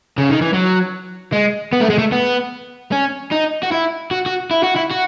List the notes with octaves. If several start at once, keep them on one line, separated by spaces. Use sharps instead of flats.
C#3
D#3
E3
F#3
G#3
B3
A3
G#3
A3
B3
C#4
D#4
F#4
E4
F#4
F#4
E4
F#4
E4
F#4